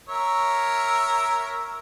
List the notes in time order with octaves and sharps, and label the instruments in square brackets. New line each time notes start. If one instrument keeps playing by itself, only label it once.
[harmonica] A#4 C#5 E5